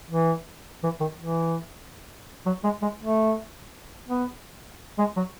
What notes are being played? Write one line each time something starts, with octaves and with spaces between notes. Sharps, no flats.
E3
E3
D#3
E3
F#3
G#3
G#3
A3
B3
G#3
F#3